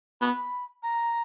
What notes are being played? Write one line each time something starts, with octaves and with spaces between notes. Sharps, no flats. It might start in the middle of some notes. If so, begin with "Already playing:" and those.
B3 B5
A#5